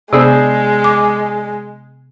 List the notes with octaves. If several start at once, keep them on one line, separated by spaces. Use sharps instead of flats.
C3 G#3 B3 D4 G#4 C5
D6